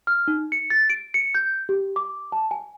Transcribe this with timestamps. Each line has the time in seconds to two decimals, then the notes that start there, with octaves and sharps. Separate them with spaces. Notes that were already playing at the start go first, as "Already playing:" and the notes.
0.07 F6
0.28 D#4
0.52 C#7
0.70 A6
0.90 D7
1.14 C#7
1.35 G6
1.69 G4
1.96 D6
2.32 A5
2.51 G#5